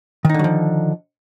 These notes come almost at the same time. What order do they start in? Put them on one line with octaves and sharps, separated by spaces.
D#3 D#4 D3 F#3 F3